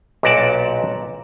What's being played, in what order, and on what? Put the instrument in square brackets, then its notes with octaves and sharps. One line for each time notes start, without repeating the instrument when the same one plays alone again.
[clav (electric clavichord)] B1 A#2 F#4 G4 D5 A5